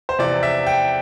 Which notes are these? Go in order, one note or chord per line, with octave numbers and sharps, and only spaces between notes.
C5
E2 C3 F3 D5
E5
G5